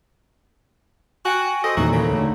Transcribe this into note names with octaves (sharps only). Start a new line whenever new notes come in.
F#4 G5 G#5
A4 C5 D#5
E2 A#2 D#3 A3 C4 D#4 F#4
F#2 C#3
D2